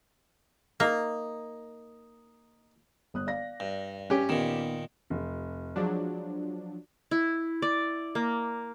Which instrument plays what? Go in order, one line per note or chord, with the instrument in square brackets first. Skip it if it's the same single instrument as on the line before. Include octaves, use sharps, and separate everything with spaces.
[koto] A#3 [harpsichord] D#4
[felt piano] G1 D#6 F#6
D5 F5 A#6
[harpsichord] G2
[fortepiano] C#4 G4 [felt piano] G#5
[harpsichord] A#2 D#3 [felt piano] B3 D#4 E7
[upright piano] F1
[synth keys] F3 F#3 D4 [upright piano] G#3
[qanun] E4
D5
A#3